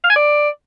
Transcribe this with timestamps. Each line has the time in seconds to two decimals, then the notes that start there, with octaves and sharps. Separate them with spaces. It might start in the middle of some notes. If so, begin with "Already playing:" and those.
0.04 F5
0.10 G#5
0.16 D5